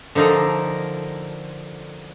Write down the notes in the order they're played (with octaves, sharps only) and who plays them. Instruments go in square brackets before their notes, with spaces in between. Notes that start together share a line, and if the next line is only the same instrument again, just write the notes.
[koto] D3 F3 D#4 A4 A#4